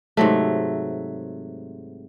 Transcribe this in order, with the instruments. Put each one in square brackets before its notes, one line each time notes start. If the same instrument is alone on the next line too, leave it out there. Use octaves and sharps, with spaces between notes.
[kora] G#2 C3 F#3 A3